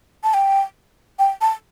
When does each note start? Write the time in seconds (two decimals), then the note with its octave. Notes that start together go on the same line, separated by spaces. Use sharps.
0.24 A5
0.34 G5
1.19 G5
1.41 A5